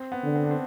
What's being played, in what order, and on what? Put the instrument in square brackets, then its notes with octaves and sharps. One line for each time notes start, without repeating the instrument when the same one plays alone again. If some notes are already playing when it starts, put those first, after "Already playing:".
Already playing: [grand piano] C4
B3
[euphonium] D3
[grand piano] C4
D4
C4